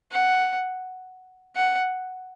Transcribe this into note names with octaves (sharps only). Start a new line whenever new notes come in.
F#5
F#5